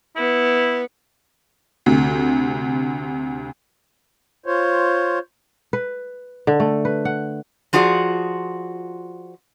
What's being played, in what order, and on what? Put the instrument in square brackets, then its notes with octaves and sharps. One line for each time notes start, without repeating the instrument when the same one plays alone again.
[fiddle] B3 [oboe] E4
[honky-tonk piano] D2 C3
[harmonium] F4 C5 C#5
[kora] B4
D3
A3
B4
F#5
[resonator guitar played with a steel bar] F3 F4 F#4 G#4 D5